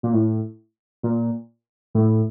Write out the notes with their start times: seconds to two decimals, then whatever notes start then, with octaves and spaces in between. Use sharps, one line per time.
0.03 A#2
0.13 A2
1.03 A#2
1.95 A2